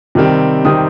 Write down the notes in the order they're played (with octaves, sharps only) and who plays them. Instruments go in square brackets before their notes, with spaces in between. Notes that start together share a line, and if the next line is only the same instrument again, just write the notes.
[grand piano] C3 D#3 G3 C4
C3 D#3 G3 C4 D#6